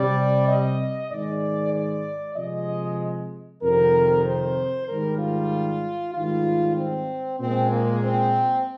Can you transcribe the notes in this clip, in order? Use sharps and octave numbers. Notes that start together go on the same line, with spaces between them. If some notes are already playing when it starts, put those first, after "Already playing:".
Already playing: C3 G3 D5
D#5
G#2 D#3 G#3 D5
D5
C3 F3 G#3 D#5
F2 C3 D#3 A#4
C5
G#2 D#3 G3 A#4
F4
G#2 D#3 G3 F4
C4
A#2 G#3 C4
A#3
C4